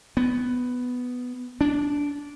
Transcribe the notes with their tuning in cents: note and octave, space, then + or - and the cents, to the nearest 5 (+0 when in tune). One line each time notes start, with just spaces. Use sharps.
B3 +5
D4 -15